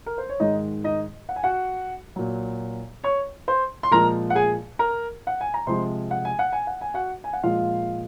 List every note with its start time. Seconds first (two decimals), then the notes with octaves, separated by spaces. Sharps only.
0.06 A#4
0.18 C5
0.29 C#5
0.40 G#2 D#3 G#3 D#4 D#5
0.84 D#4 D#5
1.29 F#5
1.36 G#5
1.43 F#4 F#5
2.16 A#2 F#3
3.04 C#5 C#6
3.48 C5 C6
3.83 C6
3.91 A#2 F3 G#3 A#4 A#5
4.30 F#5
4.35 G#4 G#5
4.79 A#4 A#5
5.27 F#5
5.41 G#5
5.54 A#5
5.67 C3 F3 G#3 C5 C6
6.11 F#5
6.25 G#5
6.39 F#5
6.52 G#5
6.67 F#5
6.81 G#5
6.94 F#4 F#5
7.24 G#5
7.33 F#5
7.43 A#2 F3 G#3 F4 F5